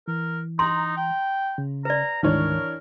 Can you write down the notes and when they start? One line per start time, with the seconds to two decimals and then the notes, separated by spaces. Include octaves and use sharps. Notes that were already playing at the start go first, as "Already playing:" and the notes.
0.08 E3 A#4
0.59 D#4 A#5 C6
0.97 G5
1.58 C#3
1.85 B4 D5 A#5
2.23 D2 G#2 D#3 E3 D4 A#4 C#5